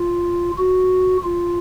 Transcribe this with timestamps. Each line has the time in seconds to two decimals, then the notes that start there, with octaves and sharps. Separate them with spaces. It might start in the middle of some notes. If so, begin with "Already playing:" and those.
Already playing: F4
0.58 F#4
1.24 F4